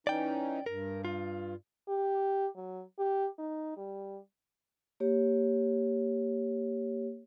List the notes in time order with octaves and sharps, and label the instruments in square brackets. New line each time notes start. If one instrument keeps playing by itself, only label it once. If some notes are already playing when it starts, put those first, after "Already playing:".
[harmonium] E3 C#4 D#4 [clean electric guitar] D5 G5
[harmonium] G2 [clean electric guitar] A#4
[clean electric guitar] F4
[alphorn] G4
F#3
G4
D#4
G3
[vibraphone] A#3 G4 C#5